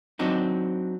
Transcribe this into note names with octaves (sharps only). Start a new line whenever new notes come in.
F#3 C4 D4 D#4